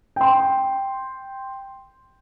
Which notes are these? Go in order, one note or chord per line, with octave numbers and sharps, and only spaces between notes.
G5 C6